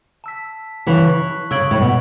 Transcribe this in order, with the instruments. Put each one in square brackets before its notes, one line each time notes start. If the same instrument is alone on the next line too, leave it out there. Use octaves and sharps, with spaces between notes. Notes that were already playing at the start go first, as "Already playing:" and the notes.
[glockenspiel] A5 E6 B6
[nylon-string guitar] C#3 E3 [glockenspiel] C#6 F#6 B6 F#7
[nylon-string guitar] C#3 [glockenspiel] C#6 E6 G#6 D7 F#7
[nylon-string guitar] A2
B2